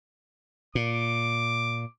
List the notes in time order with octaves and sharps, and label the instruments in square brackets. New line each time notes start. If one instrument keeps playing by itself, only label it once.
[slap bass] A#2 [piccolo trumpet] D6